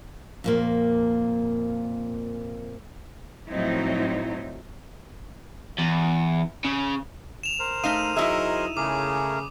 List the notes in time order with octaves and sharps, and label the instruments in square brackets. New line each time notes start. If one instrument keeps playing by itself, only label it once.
[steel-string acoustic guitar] F2 A#2 A#3
[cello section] A2 F3 F#3 C4 D#4 E4
[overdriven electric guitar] E2
C#3
[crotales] E7 F7
[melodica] A#4 C5
[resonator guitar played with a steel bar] A3 D#4 F5 [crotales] D#6 D#7
[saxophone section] F#3 G#4 D#5 [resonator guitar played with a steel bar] D#4 E4 E5
[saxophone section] C#3 [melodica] A3 G#4 A#4 [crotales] D6